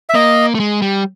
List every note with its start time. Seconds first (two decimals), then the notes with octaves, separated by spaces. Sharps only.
0.09 E5
0.15 A#3 D#5
0.55 A3
0.60 G#3
0.82 G3